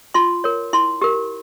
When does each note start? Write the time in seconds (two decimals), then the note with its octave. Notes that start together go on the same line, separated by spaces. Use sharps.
0.14 F4 C6
0.44 A#4 C#5
0.73 E4 C6
1.02 G4 A#4